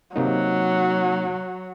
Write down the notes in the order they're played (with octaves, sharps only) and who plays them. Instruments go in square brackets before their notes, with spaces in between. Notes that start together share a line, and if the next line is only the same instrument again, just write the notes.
[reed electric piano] C3 A#3 D#4 [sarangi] F#3